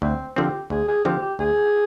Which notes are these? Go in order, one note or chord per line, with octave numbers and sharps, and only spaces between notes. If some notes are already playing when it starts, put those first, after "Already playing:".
D2 C4
D3 F3 C4 G4
D2 G#4
G#4
D3 F3 C4 G4
G4
D2 G#4